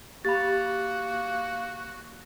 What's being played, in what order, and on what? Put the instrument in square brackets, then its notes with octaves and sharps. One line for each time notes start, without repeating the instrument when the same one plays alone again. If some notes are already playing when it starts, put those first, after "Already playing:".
[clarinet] A#3 [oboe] F#4 [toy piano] G4 B5 [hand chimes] A6